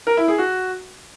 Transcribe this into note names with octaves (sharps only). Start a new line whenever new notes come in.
A#4
E4
G#4
F#4